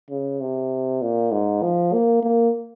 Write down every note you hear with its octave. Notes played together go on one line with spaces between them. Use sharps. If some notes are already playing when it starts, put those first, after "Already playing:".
C#3
C3
A#2
G#2
F3
A#3
A#3